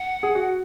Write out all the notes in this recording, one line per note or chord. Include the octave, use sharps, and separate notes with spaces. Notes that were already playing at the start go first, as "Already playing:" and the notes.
Already playing: F#5
G#4
F#4